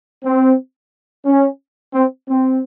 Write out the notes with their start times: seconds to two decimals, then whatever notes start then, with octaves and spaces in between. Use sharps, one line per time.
0.24 C4
1.25 C#4
1.94 C4
2.28 C4